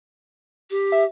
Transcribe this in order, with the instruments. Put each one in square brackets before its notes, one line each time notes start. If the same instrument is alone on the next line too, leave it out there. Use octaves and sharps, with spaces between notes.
[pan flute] G4
[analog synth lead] E5